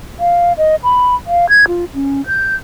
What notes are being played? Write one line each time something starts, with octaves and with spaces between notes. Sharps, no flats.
F5
D#5
B5
F5
G#6
F4
C#4
G6